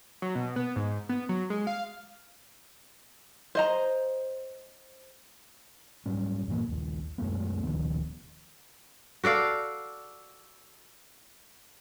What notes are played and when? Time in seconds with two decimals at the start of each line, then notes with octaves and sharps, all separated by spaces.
0.22 F#3
0.35 B2
0.56 B3
0.76 G#2
1.09 B3
1.29 F#3
1.50 G#3
1.67 F5
3.55 C5 D#5 A#5
6.06 G#2 F#3 G3 C#4
6.48 G2 A#2 E3 A#3
6.68 A#1 D#2
7.18 F#2 G#3 A3 B3
7.63 D1 D#3 F3 B3
9.24 F#4 A4 D5 F5